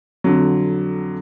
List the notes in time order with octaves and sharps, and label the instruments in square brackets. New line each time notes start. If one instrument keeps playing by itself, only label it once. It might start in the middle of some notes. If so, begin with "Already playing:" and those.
[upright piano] F2 D3 F#3